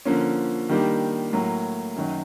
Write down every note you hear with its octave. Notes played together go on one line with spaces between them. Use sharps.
D3 F3 A#3 C#4
D#3 G3 A#3 D4
A2 F#3 A#3
F#2 D#3 F#3